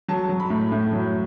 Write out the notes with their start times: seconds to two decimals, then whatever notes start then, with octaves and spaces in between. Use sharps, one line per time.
0.08 F#3 A5
0.29 F#3
0.40 B5
0.50 A2
0.72 A2
0.93 F#3